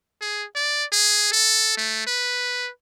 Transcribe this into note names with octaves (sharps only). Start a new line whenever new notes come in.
G#4
D5
G#4
A4
A3
B4